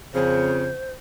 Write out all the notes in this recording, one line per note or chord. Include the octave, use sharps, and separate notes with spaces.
F2 C#3 C5